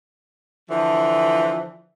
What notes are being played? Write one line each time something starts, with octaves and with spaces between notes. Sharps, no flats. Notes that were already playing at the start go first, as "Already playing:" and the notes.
D3 E3 F3